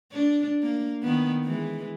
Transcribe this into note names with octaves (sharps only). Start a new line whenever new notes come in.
D4
A#3
D#3 B3
E3 G#3